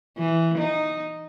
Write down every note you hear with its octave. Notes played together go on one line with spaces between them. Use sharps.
E3
D#4